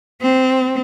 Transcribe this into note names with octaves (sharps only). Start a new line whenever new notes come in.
C4